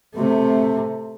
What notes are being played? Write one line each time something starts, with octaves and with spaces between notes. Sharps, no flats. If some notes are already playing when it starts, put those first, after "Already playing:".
C3 A3